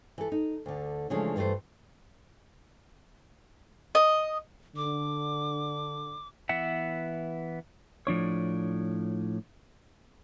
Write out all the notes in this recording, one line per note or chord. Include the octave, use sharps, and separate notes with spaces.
E3 A4
D#4
D2 D3
C#3 E3 F3 G#3 A3 D4
G2 E3 A3 B4 C5
D#5
D3 D6
E3 B3 E5 F#5
A2 F3 D4 C#5